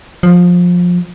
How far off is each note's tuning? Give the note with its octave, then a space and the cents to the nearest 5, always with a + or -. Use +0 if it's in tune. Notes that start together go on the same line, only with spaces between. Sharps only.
F3 +20